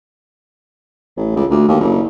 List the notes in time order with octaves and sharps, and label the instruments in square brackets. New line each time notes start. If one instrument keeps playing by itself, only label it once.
[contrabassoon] A1
C#2
D2
D#2
F#1